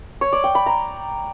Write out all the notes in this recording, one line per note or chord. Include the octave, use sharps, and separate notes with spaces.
C#5
D5
G5
B5
A#5